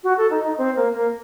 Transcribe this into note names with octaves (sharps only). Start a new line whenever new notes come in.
F#4
A4
D#4
D#4
C4
A#3
A#3